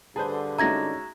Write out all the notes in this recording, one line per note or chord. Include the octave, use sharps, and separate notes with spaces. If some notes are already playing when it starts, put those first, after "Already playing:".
G2 D3 G#4 B4 C5 A5
G#3 C#4 D#4 F#4 E5 A#5 G#6 A#6